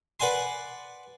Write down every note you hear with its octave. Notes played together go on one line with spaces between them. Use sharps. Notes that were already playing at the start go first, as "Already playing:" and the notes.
B4 D5 F#5 G#5 C6